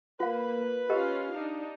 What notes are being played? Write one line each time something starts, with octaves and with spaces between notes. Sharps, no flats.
A#3 F4 B4 F5
C#4 F4 G4 A#4 D#5 F5
D4 D#4